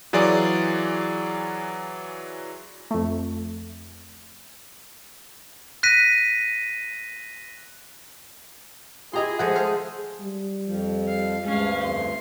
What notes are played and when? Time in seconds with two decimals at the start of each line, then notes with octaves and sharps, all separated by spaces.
0.13 E3 F#3 F4 G#4 D5
2.91 F2 A3
5.83 F#6 A#6 B6 D#7
9.13 E4 F4 G4 G#4 D#5 A#5 C6
9.39 F3 G#3 A3 E5 F#5
9.55 A4 C5 F5
10.21 G3
10.66 F2 F3
11.08 F5
11.45 D2 G2 G#3 C#4 F5
11.84 F2 C6